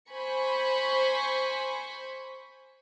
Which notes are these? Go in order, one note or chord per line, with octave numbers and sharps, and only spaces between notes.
C5 G#5 B5 C#6